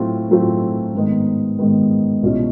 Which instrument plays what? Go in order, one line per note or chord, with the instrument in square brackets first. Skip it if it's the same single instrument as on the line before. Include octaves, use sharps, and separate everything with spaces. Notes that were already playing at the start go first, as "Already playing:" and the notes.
Already playing: [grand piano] A2 F#3 A3 C4 F4
A2 F#3 A3 C4 F4
G#2 D#3 G#3 B3
G#2 D#3 G#3 B3
C2 B2 G#3 C#4 F4